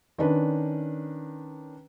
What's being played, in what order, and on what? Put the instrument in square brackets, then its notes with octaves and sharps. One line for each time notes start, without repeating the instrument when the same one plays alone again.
[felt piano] D#3 C#4 D4 B4